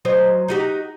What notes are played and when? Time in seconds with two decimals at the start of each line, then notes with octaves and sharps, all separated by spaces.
0.05 F#3 C5 D#5
0.48 D#4 F#4 G4